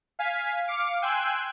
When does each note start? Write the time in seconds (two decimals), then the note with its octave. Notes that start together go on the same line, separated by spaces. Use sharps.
0.19 F5 G#5 B6
0.67 F5 D6 C#7
1.02 G5 G#5 C6 E6 F#6 G#6